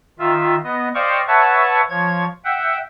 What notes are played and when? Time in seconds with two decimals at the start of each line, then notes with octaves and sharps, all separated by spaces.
0.19 D#3 F4 E5
0.64 B3 D#5
0.95 C5 D5 D#5 F5 G5 C#6
1.27 B4 C#5 E5 F#5 A5 C#6
1.90 F3 C#5 G#6
2.45 E5 F#5 G5